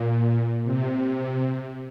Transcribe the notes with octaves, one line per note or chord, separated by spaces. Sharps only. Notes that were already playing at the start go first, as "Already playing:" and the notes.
Already playing: A#2
C3